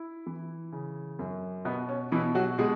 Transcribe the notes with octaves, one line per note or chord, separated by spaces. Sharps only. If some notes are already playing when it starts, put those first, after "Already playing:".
Already playing: E4
E3
C#3
F#2
B2 B3
C#4
B2 E3 E4
F#3 F#4
B2 G#3 G#4